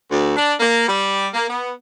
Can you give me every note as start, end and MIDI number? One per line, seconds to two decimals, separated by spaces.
0.11 0.35 38
0.36 0.53 62
0.59 0.85 58
0.88 1.28 55
1.34 1.46 58
1.50 1.72 59